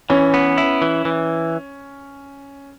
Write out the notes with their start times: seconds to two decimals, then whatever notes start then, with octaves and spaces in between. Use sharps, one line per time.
0.10 E3 C#4
0.34 B3
0.58 E4
0.82 E3
1.05 E3